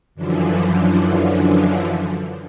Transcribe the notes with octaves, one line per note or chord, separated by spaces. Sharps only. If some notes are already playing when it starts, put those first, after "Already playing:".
F#2 D3 E3 F3